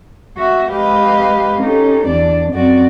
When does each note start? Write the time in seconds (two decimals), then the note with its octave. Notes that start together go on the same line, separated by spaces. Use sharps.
0.38 F#4 E5
0.71 G#3 G4 B4 D#5 F5
1.61 C#4 D#4 G4 A4
2.08 E2 D4 D5
2.52 F#2 C4 F#4 D5